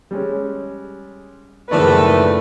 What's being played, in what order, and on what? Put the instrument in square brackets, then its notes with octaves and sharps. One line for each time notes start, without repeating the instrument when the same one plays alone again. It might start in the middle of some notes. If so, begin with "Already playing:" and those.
[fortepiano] G3 G#3 C#4
[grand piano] F#1 F3 D5 [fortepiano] A2 D#3 G#3 [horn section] A3 [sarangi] B4